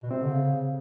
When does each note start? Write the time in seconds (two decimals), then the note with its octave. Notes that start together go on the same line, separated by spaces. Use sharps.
0.03 B2
0.10 C3 C4
0.22 D3
0.31 C#3
0.52 C#3